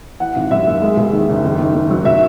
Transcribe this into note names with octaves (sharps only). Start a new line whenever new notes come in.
E3 F#5
G#1
F#2 E5
A#3
G#3
E2
D#3
F#1
D#3
D#3
D#3
F#3
F#3 E5